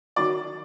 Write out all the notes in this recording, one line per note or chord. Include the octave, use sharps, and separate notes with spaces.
D#3 F#3 D5